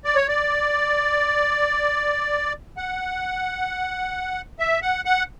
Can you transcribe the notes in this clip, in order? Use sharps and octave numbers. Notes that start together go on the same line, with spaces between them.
D5
C#5
D5
F#5
E5
F#5
F#5